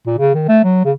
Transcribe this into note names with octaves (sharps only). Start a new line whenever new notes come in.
A#2
C#3
D#3
A3
F#3
C#3